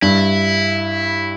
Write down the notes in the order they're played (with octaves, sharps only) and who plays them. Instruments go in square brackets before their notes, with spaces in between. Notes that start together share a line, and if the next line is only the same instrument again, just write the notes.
[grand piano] G2 G3 [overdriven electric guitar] E4